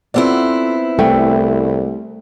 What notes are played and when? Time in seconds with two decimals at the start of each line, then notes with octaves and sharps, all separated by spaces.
0.14 B3 C4 E4 F4 A4 D5
0.99 C2 A3 G5